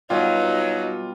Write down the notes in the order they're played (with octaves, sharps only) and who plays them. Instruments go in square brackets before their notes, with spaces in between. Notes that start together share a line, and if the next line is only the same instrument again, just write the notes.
[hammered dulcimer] B2 G3 [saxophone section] F#3 [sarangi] D#4 [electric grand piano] F4